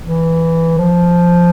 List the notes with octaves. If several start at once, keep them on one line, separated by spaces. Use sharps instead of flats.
E3
F3